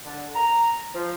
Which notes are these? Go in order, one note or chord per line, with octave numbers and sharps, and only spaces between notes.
D3
A#5
F3